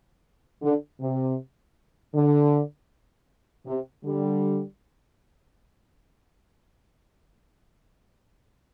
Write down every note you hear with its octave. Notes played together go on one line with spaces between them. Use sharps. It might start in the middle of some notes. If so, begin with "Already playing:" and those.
D3
C3
D3
C3
D3 G3